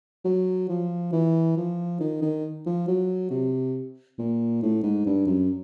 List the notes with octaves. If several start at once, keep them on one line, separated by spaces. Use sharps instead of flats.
F#3
F3
E3
F3
D#3
D#3
F3
F#3
C3
A#2
A2
G#2
G2
F#2